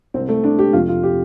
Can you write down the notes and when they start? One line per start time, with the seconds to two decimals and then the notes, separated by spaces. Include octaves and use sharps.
0.14 C2 C4
0.17 C3
0.29 A3
0.44 D4
0.59 G4
0.73 F2 C3 F4
0.88 F4
1.03 G4